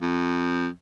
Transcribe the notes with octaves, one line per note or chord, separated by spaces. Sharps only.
F2